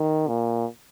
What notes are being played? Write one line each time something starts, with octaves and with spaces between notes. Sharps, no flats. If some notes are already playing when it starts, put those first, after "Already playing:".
Already playing: D#3
A#2